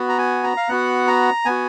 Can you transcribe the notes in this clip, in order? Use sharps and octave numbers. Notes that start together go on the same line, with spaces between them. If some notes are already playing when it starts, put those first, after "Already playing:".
Already playing: B3 F#4
A#5
G#5
A#5
F5
B3 F#4 F#5
A#5
B3 F#4 G#5